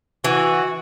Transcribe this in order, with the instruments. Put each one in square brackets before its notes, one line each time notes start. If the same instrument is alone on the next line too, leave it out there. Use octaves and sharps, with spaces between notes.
[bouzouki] E3 [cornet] F#4